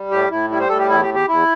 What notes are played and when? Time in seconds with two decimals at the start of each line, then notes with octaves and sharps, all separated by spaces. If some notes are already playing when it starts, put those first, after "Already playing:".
Already playing: G3
0.11 A2 G4
0.30 A2 E4
0.50 G3 E4
0.60 C5
0.69 A2 A4
0.79 G4
0.89 E2 E4
1.03 G4
1.08 E2
1.14 G4
1.28 E2 E4